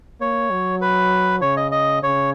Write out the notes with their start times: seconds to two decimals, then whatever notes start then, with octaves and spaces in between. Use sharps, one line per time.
0.21 A#3 C#5
0.50 F#3
0.81 B4
1.41 C#3 C#5
1.57 D#5
1.72 D#5
2.03 C#3 C#5